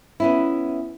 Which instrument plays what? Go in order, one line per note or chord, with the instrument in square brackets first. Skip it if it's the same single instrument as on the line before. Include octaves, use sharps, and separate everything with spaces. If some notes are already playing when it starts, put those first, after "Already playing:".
[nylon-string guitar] B3 C#4 E4